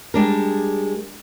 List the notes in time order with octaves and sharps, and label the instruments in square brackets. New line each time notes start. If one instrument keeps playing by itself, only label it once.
[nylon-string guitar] G3 G#3 D4 A#4